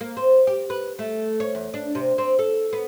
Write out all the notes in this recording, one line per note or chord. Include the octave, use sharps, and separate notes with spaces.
A#3
C4
G4
B4
A3
C#5
E2
D4
C3
C4
A4
B3